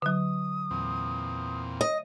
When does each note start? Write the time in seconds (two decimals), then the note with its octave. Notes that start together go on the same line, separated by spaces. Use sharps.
0.02 D3 F#3 D#6
0.71 E2 A#2 C4
1.81 D#5 D#6